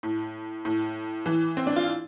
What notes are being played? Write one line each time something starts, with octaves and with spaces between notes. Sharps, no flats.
A2
A2
E3
C4
D4
F4